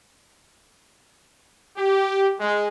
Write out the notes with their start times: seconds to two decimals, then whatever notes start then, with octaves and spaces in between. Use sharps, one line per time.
1.77 G4
2.39 G#3